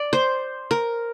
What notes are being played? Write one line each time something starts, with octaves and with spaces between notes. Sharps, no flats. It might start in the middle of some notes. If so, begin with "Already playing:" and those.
Already playing: D5
C5
A#4